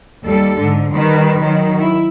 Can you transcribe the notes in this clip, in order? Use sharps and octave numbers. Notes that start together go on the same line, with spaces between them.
D#2 G3 A4
G#2 D3
D#3 G3 B4
D#3 F#3
E4